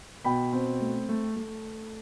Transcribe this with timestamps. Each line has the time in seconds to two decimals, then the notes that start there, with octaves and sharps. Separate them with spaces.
0.25 B2 G5 B5
0.53 C4
0.81 A3
1.09 A3
1.36 A3